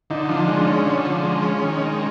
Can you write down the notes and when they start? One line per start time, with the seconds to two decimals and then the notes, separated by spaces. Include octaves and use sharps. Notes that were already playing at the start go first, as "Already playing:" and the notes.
0.10 D3 D#4
0.29 F3
0.36 D4
0.48 G#3
0.61 D4
0.67 C#4
0.86 D3
1.05 F3
1.23 G#3
1.43 C#4
1.62 D#3
1.81 G#3